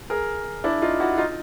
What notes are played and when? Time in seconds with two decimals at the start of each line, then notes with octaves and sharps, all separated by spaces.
0.10 G#4 A#4
0.64 D4 E4
0.82 D#4 F4
1.00 E4 F#4
1.18 D#4 F4